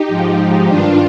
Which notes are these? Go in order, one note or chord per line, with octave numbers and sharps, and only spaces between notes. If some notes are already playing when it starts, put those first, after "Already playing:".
Already playing: D#4 G4
G#2 F3
G2 D#3 D4 F4